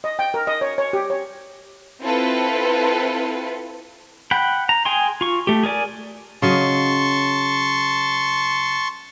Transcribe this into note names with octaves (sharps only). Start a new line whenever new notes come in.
D#5
G5
A#4
D#5
C#5
C#5
G4
C#5
C4 E4 F4 A4 B4
F#5 G5 B5
A#5
G#4 G5 G#5 C6
F4 C#6
A3 G4
G#4 A#4 D5 G#5
C#3 F#3 D#5 A5 C6 C#6